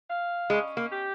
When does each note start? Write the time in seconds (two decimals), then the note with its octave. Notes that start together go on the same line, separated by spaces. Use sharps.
0.09 F5
0.50 G#3 C#4
0.77 A#3
0.91 G4